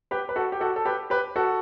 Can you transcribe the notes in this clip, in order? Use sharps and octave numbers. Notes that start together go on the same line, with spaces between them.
G4 B4
B4
F#4 A4
G4
F#4 A4
A4
G4 B4
G4 B4
F#4 A4